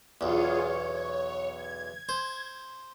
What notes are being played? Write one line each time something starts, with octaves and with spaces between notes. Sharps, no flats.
B1 E2 F4 G#4 C#5
C#5
G#6
C5